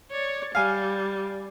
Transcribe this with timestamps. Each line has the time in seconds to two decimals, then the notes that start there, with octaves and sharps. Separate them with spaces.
0.11 C#5 D5
0.55 G3 F5 G#5